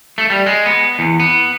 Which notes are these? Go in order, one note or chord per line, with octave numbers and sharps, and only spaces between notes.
A3
G3
G#3
B3
E2
B3